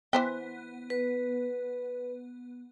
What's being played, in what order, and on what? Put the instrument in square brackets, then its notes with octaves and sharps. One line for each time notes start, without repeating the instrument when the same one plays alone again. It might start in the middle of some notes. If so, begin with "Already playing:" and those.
[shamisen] E3 C5 G5 [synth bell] B3
[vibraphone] B4